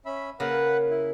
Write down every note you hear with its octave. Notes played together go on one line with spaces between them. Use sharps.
C#4 E5 B5
C#3 A#3 A#4 B4 F#5
E4